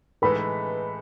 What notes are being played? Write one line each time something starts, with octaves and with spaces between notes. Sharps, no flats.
A2 E3 G#3 D#4 A4 B4 B5